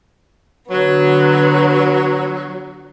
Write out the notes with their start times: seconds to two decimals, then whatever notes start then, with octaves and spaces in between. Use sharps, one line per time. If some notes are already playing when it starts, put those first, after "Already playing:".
0.71 D3 F#3 B3